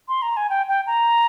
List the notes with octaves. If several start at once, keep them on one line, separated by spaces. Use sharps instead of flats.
C6
A#5
G#5
G5
G5
A#5